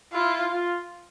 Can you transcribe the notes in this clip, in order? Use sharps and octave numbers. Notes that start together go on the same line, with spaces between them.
E4 F4
F4